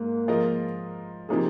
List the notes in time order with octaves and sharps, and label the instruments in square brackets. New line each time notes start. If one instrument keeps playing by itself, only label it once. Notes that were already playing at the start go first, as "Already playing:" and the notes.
Already playing: [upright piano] G#2 [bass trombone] A#3
[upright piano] F3 G#3 F4 A#4 D#5
C3 F3 A#3 D#4 G#4